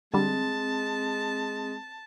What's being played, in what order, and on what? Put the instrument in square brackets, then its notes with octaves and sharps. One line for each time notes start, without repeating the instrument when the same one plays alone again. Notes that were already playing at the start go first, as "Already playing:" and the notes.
[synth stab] D3 G3 [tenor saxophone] G#3 [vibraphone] C4 [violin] A5